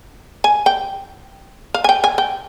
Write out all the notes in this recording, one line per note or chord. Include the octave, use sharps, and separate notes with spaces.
G#5
G5
F5
G#5
G5
G#5
G5